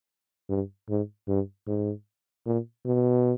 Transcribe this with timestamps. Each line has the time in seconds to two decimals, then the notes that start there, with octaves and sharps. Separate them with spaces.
0.49 G2
0.89 G#2
1.28 G2
1.67 G#2
2.46 A#2
2.86 B2